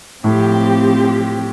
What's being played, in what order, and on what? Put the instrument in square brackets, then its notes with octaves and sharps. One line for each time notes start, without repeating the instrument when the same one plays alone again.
[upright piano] A2 [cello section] F3 C4 G4